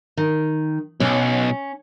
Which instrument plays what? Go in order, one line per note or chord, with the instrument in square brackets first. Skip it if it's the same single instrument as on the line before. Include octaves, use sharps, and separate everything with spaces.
[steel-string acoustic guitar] D#3
[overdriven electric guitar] B1 [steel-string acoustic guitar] C#4